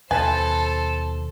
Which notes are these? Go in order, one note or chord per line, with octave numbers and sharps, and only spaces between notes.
D#2 B2 A4 B4 C5 G#5 A5